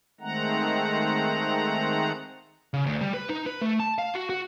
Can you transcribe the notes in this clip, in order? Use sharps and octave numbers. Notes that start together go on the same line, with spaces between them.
D#3 G#3 A3 C4 F#5 A#5
C#3
D2
G3
B4
D#4
B4
A3
A5
F5
F#4
F#4